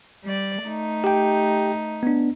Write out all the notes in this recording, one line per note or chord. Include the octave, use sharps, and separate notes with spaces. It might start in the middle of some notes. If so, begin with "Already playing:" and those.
G3 D5
A3 D#4
G4 G5
B3 D4